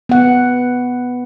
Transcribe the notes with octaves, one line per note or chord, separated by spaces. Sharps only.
B3 F#5